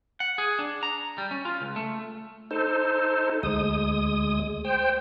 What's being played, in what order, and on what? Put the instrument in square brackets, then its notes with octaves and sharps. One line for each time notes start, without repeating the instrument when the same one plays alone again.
[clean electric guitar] F#5
G#4
D4
A#5
G3
C#4
F4
C#2
A3
[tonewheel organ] D#4 A4 C5
D2 G#3 D#6
C5 G5